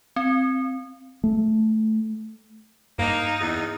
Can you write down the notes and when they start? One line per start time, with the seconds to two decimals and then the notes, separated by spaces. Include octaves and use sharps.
0.16 C4
1.24 A3
2.99 G2 A#3 D#4
3.40 E2